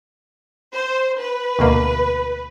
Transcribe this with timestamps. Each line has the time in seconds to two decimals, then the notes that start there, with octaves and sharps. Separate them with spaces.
0.74 C5
1.19 B4
1.59 D2 B2 A#3